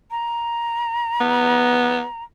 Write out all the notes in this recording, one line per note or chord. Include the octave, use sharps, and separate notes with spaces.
A#5
B3